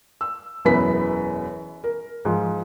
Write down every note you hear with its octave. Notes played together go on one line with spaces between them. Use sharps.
E6
E1 F#2 E3 B3 B6
A#4
G#2 F3